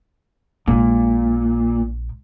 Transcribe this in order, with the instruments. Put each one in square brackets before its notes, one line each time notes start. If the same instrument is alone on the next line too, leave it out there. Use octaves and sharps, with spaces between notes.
[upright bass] A#1 G#3 [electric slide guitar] A#2